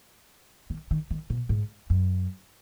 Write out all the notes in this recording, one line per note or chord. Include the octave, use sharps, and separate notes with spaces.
D#3
D#3
D#3
B2
G#2
F#2